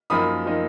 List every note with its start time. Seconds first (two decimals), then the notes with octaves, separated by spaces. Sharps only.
0.10 F#2 F3 A#3 D#4 B5 D#6
0.45 F3 A#3 D#4